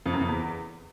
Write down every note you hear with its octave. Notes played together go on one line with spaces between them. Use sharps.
F2
F#2
F2
E2